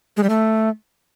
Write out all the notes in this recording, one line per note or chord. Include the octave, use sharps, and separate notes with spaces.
G#3
G3
A3